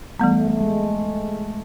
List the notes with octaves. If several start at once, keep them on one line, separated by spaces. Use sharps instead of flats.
E3 G3 A3 B3
A3
A3
G#3